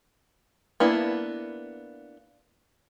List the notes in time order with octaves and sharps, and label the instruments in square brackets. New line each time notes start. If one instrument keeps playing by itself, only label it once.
[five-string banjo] A#3 B3 D4 E4